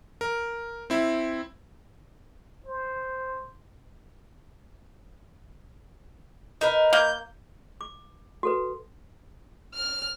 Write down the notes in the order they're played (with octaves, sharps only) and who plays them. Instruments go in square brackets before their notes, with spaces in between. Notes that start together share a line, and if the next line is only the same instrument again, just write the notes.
[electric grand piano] A#4
C4 E4
[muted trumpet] C5
[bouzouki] D#4 A#4 B4
[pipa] A#3 [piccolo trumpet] G6
[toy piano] D6
F#4 A4 B4
[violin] F6